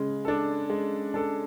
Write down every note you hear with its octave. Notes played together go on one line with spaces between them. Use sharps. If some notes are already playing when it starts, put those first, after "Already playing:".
Already playing: C#3 G#3
D4 A4
G#3
D4 A4